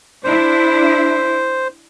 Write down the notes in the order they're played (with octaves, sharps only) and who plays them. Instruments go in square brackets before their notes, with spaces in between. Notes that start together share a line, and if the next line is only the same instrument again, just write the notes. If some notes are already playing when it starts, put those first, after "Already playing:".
[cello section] D4 E4 [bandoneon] C5